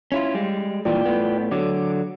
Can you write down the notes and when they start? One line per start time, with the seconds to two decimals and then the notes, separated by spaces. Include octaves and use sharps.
0.12 C#4 E4 F4
0.34 G3 G#3
0.85 G2 A#2 E3 F4 D5 G5
1.05 A2 B3
1.51 D3 F#3 D6